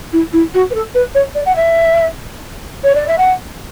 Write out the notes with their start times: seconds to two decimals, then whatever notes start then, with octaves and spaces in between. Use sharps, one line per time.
0.12 E4
0.33 E4
0.54 F#4
0.70 B4
0.74 A4
0.94 B4
1.14 C#5
1.34 D5
1.45 F#5
1.55 E5
2.83 C#5
2.95 D5
3.07 E5
3.18 F#5